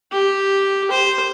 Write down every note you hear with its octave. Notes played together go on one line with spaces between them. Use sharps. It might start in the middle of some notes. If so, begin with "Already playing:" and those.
G4
C5